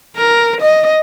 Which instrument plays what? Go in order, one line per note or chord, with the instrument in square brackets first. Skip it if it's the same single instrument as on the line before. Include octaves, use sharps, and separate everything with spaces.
[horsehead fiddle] A#4
D#5